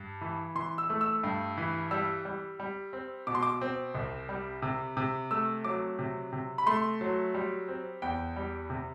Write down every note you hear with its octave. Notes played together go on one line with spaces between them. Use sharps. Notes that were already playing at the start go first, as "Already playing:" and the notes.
Already playing: G2
E3
E3 C6
E6
A3
E6
G2
E3
G3 E6
G3
G3
C4
B2 D6
C6
D6
C4
C2
G3
C3
C3
A3 E6
F#3 D6
C3
C3
B5
A3 C6
F#3
G3
C4
E2 G5
G3
C3